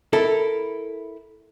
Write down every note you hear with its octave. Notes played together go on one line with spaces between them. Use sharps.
E4 A4 A#4